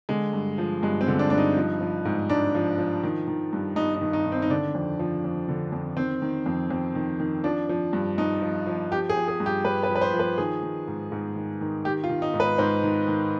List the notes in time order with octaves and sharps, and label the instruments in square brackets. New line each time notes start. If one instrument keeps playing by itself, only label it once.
[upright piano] D3 G#3
G2
F3
G2 G#3
C4
D3
D4
G2 D4
D#4
F3
F3
G#2
G#2 D4
F3
F3
D#3
D#3
G2
G2 D#4
D#4
D#3
D#4
D#3
C4
D#4
D3 D4
F2
F3
F2
D3
F2
D#3 C4
D#3
F2
F2
D#3
D#3
F3 D4
F3
G2
G2 D#4
F3
F3
F3 G4
G#4
F3
G#4
G2
G4
G2 B4
B4
F3
B4
C5
F3
B4
D#3 G#4
D#3
G#2
G#2
D#3
D#3
D#3 G4
F4
D#3
D#4
G#2
B4
G#2 C5
D#3
D#3